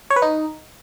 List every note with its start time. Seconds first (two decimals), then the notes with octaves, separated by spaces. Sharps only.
0.10 C#5
0.16 B4
0.22 D#4